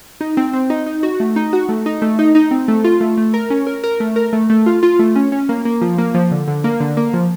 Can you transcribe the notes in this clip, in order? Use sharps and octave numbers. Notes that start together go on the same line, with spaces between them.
D#4
C4
C4
D#4
D#4
F#4
A3
D#4
F#4
A3
D#4
A3
D#4
D#4
C4
A3
F4
A3
A3
A#4
C#4
A#4
A#4
A3
A#4
A3
A3
F4
F4
A3
C#4
C#4
A#3
A#3
F3
A#3
F3
D3
D3
A#3
D3
A#3
F3